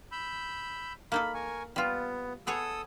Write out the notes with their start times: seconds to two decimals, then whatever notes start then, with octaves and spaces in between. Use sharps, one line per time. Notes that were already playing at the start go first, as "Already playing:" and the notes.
0.12 B5 E6 G6
1.12 A#3 D#4 A4 B5
1.34 A#4 G#5 C#6
1.76 G3 B3 F4
2.47 B3 G#4 A4 C#5 D#6 E6